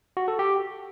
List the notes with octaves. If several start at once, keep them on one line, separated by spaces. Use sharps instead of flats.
F#4
A4
G4